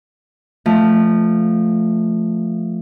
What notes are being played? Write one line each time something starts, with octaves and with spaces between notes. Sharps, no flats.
F3 A3